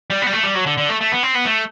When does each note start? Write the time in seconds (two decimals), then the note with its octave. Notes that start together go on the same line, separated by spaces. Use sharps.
0.10 G3
0.22 B3
0.27 G3
0.33 A3
0.43 G3
0.55 F#3
0.66 D3
0.78 D3
0.89 A3
1.01 A3
1.12 B3
1.23 C4
1.35 B3
1.46 A3